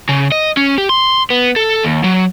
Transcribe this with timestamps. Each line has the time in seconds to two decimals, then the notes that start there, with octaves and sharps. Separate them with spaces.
0.09 C#3
0.32 D#5
0.57 C#4
0.78 G4
0.89 C6
1.30 B3
1.56 A4
1.83 D#2
2.04 F#3